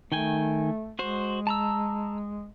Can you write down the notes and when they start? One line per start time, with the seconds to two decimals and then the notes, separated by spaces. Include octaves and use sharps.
0.12 D#3 A3 G5 G#5
0.99 G#3 F#4 C5
1.47 A5 A#5 E6